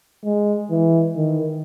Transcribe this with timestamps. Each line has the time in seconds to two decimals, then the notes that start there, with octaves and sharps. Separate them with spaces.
0.24 G#3
0.70 E3
1.17 D#3